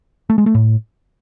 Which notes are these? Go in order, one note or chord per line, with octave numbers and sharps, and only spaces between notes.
A3
G#3
A3
A2